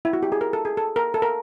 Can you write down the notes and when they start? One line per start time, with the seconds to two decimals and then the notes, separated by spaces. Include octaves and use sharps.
0.05 E4
0.13 F#4
0.23 G4
0.32 G#4
0.41 A#4
0.53 A4
0.65 G#4
0.77 A4
0.96 A#4
1.14 A4
1.22 A#4